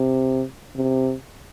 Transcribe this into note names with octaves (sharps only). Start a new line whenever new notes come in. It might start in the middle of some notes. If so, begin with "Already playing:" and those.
Already playing: C3
C3